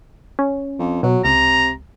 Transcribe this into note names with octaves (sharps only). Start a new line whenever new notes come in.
C#4
F2
B2 F#3
C#2 C3 A#5